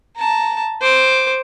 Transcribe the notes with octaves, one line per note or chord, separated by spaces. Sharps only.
A5 A#5
C5 D6